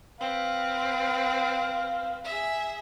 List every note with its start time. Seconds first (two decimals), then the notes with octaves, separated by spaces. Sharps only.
0.20 C4 B4 F5
2.24 G#4 E5